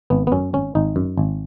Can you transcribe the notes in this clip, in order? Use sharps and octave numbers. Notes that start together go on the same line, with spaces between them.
G#1 B3
B3
F#2 C#4
G#1 C#4
G#1 D#4
F#2
G#1